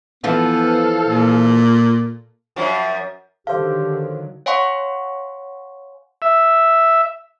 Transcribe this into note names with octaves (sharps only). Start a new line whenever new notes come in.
E3 F3 B3 F4 A4 F5
A#2
F#2 F3
D3 D#3 F#3 G4 A4 C5 F5
C#5 F5 F#5 G#5 C6 C#6
E5